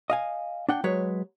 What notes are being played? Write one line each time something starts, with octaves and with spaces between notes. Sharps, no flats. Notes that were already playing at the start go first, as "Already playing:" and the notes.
D#5 F5 G#5
D4 F#5 G5
F#3 G#3 B4 C#5